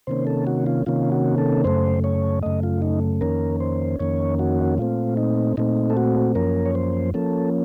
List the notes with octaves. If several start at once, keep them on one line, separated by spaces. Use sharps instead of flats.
C3 D#3 A#3 C#4 C5
A4
F#4
F4
C3 D#3 A#3 C#4 F4
F#4
A4
F#2 C#3 A3 C5
C#5
F#2 C#3 A3 D#5
F4
D#4
F2 D#3 A#3 C#4 A#4
C5
F2 D#3 A#3 C#4 C#5
F#4
A#2 A3 C4 F4
D#4
A#2 A3 C4 D#4
A4
F#4
F#2 F3 A#3 C#4 A#4
C#5
C5
F3 A#3 C#4 A4